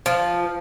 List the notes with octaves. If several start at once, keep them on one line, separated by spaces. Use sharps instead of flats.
F3